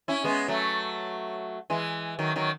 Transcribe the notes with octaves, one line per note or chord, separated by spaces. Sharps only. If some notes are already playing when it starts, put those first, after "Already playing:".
C#4 E4
G#3 B3
F#3 A3
E3 G#3
D#3 F#3
D#3 F#3